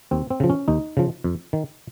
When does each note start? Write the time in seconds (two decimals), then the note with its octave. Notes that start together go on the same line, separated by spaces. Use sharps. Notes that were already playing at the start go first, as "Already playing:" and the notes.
0.11 D#2 C4
0.30 C4
0.40 C#3 F3
0.50 C#4
0.68 D#2 D#4
0.97 C#3 F3
1.24 F2
1.53 D#3